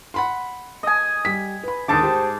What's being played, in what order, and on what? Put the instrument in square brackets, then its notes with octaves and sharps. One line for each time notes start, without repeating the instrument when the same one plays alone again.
[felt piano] F#5 B5 C6
[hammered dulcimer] D#5 G#5
[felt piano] G3 B6
B4 B5
[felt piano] D#2 D3 [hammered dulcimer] G#2 A5 D6
[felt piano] G4 C5